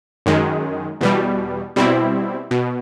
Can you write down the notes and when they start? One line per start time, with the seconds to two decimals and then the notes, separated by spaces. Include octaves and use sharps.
0.26 F#2 D#3 G#3
1.01 E2 B2 G3
1.76 B2 G3 C4 E4
2.51 B2